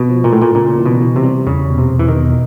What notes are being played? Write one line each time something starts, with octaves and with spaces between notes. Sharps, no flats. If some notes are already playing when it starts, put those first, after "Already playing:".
Already playing: B2
F3
A#2
A2 A3
A#2
A#2 C#3
E3
B2
E3
C3
G3
E2 C#3
B2
C3
E2
E3
D#3
B2